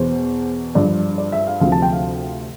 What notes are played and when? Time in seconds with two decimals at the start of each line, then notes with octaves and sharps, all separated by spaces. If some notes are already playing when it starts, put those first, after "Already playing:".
Already playing: E2 B2 C5
0.75 G2 F3 D5
1.18 D5
1.32 E5
1.47 F5
1.60 D2 C3 F3 F5
1.72 A5
1.82 G5
1.93 F5